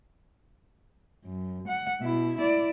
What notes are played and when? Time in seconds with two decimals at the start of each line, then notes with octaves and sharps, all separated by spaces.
1.24 F#2
1.68 F#5
2.01 B2 E4
2.38 E4 D5